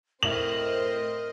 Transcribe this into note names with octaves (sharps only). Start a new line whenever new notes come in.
A2 C4 A#4 C5 D#5 E5 F#7